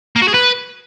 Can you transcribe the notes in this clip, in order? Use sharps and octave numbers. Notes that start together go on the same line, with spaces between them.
A#3
F#4
G#4
B4